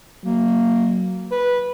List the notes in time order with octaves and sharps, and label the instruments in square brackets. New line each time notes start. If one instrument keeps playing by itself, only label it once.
[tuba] F#3 [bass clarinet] A#3
[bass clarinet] B4